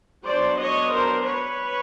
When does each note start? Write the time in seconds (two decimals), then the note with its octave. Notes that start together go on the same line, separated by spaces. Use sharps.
0.25 F#3 B3 D4 C5 D5
0.58 C#5 D#5
0.91 A#4 C5
1.25 B4 C#5